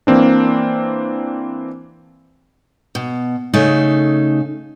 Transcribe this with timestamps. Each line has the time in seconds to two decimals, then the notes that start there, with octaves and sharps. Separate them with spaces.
0.07 E3 A#3 C4 D4
2.95 B2
3.53 C#3 A3 D#4